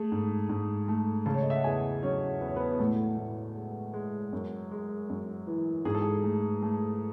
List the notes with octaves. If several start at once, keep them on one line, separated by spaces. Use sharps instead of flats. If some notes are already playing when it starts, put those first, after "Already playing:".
Already playing: A3 G#4
G#2
G#2
A3
C#3 A4 A5
C#5
D#5
E5
F#5
E2 G#4 G#5
F#3 C#4 C#5
E2 B4
C#5
B3 B4
B4
A2 A3 A4
A2
G#3
G#3
F#2
G#3
F#2
E3
G#2 G#4
A4
G#4
A3
A3